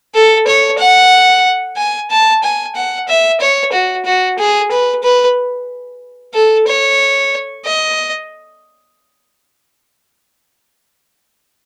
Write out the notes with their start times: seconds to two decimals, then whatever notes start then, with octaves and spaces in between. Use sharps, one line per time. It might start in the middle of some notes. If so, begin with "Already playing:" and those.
0.14 A4
0.47 C#5
0.79 F#5
1.77 G#5
2.10 A5
2.43 G#5
2.75 F#5
3.08 E5
3.41 C#5
3.72 F#4
4.05 F#4
4.38 G#4
4.71 B4
5.03 B4
6.34 A4
6.67 C#5
7.65 D#5